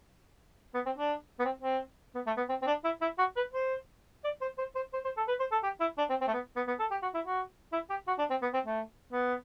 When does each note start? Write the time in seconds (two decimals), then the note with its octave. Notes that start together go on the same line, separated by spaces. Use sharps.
0.74 B3
0.86 C4
0.99 D4
1.40 B3
1.45 C4
1.62 C4
2.15 B3
2.27 A3
2.37 B3
2.49 C4
2.62 C4
2.67 D4
2.84 E4
3.02 E4
3.19 F#4
3.37 B4
3.54 C5
4.24 D5
4.42 C5
4.58 C5
4.76 C5
4.94 C5
5.05 C5
5.17 A4
5.28 B4
5.40 C5
5.52 A4
5.64 G4
5.80 E4
5.98 D4
6.10 C4
6.21 C4
6.28 A3
6.34 B3
6.57 B3
6.68 B3
6.80 A4
6.91 G4
7.03 F#4
7.15 E4
7.26 F#4
7.73 E4
7.90 G4
8.08 F#4
8.19 D4
8.30 C4
8.42 B3
8.54 C4
8.66 A3
9.13 B3